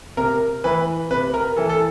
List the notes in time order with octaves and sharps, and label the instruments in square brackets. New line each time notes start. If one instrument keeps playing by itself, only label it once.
[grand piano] C3 A#4
E3 B4
C3 B4
A#4
E3 A4
A4